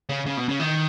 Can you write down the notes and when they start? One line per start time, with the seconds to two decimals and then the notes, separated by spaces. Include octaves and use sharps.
0.09 C#3
0.26 C#3
0.37 B2
0.49 C#3
0.60 D#3